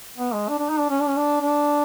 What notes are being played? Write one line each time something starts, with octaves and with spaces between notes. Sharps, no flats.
B3
G#3
D4
D4
D#4
D4
C#4
D4
C#4
D4
D4